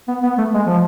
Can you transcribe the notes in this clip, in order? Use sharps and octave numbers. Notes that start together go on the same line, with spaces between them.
B3
B3
A3
G#3
F3